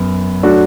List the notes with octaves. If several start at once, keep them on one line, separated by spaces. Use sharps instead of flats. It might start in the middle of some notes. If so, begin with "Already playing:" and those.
Already playing: F#2 B3
F#3 A3 D4 F#4